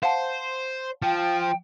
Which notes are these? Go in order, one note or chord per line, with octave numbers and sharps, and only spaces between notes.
C5 F5 F#5 A5
F3 G5